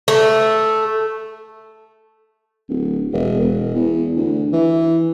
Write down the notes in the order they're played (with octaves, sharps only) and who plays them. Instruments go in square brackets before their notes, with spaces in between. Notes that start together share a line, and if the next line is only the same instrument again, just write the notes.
[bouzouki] A3
[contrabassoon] D1
E1
E1
E2
D2
E3